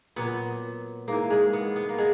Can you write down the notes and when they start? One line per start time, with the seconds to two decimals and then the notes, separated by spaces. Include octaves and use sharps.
0.16 A#2 F#3 B3
1.08 G#2 E3 A#3
1.30 G#3
1.53 B3
1.76 B3
1.89 A#3
1.98 G#3